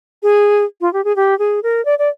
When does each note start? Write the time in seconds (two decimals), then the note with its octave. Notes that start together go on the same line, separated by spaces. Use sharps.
0.23 G#4
0.81 F4
0.93 G4
1.05 G#4
1.16 G4
1.39 G#4
1.63 A#4
1.85 D5
1.99 D5